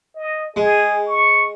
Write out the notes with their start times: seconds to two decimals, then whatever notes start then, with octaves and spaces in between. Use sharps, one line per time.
0.15 D#5
0.56 G#3 G#4
1.08 C#6